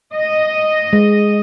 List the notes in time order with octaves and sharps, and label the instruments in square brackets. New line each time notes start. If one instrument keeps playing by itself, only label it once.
[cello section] D#5
[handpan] G#3